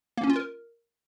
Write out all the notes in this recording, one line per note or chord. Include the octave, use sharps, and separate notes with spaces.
A#3
C#4
F4
A#4